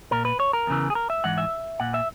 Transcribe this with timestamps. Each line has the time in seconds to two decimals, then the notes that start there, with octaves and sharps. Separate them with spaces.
0.11 A#2 A#4
0.25 B4
0.40 C#5
0.53 A#4
0.67 E2 C#3 E3
0.90 G#4
0.95 A#4
1.10 E5
1.24 G#2 E3 F#5
1.38 E5
1.80 A#2 F#5
1.94 E5